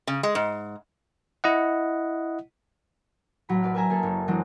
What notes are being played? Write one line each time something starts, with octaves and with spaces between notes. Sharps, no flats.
C#3
G#3
G#2
E4 D#5 F#5
A1 F#3 B5
B4 D5 F6
A#4 B4 D5 E5 G#5 A#5
A#3 G#4 A4
F#1 C#5
E3 F#3 G#3 C4 D4